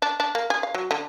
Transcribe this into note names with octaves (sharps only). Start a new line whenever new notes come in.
D4
D4
A#3
G#4
F5
F#3
D3